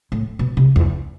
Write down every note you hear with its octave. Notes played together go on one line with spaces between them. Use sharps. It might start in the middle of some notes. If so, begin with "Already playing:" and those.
A2
B2
C3
E2